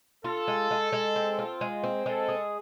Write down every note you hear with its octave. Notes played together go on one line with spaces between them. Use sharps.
F4 A4
G#3
G#3
G#3
C4
F4
G#3
C4
G#3 A4
G#4